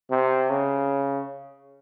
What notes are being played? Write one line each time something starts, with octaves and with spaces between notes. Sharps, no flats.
C3
C#3